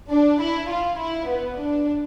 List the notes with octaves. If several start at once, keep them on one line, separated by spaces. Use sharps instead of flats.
D4
E4
F4
E4
B3
D4